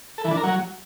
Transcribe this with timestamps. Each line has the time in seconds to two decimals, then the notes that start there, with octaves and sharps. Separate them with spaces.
0.18 A4
0.24 E3
0.31 D4
0.37 A#4
0.43 F#3